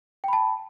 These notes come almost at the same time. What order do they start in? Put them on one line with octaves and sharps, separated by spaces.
G5 B5 A5